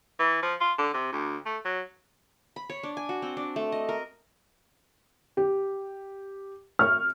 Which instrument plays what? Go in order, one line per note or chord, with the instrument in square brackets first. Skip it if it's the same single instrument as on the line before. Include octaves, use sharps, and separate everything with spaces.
[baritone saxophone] E3
F3
F4
D3
C3
D2
A3
F#3
[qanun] B5
C#5
D4
G#5
F#4
C4
D4
A3
D#5
A#4
[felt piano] G4
[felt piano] C#6 [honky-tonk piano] F6